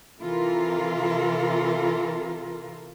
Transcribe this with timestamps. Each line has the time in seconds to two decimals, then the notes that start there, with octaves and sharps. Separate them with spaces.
0.21 C3 E3 F4 A4 A#4